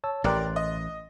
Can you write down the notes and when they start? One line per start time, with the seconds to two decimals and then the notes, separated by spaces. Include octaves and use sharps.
0.04 C#5 A5 E6
0.24 A1 G4 A#4 D5 C6 F#6 A6
0.56 D#5